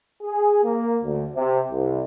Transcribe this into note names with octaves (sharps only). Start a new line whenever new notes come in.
G#4
A#3
D2
C3
C2